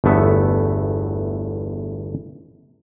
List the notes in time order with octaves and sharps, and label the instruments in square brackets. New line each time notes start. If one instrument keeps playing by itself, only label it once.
[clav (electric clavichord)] G1 E2 A3 B3 E5